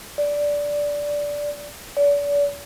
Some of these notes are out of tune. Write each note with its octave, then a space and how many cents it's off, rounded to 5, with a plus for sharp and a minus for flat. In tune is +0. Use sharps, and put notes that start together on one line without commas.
D5 -10
D5 -40